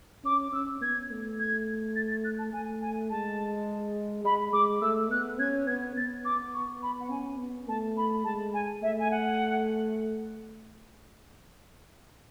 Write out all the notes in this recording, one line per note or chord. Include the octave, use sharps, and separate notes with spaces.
C#4 D6
C#4 E6
B3 G#6
A3
G#6
A6
A6
F#6
A5
A3 G#5
G#5
G#3 A5
G#3 B5
G#3 D6
A3 E6
B3 F#6
C#4 G#6
B3 G#6
B3 A6
D6
C#6
B5
F#5
C#4 G#5
B3
A3 A5
B5
G#3 A5
G#5
A3 E5
G#5
F#5